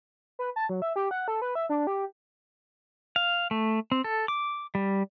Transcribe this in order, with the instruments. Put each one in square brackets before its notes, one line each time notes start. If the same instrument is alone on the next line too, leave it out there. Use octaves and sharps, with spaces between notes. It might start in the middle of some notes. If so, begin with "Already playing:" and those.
[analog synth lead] B4
A5
F#3
E5
G4
F#5
A4
B4
E5
D4
G4
[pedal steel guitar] F5
A3
C4
A4
D6
G3